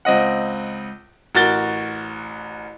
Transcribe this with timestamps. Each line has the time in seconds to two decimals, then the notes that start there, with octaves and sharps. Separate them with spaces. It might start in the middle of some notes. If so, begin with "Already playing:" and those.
0.05 C#2 C4 D#5 F#5
1.35 A1 F#4 A#4 A6 G7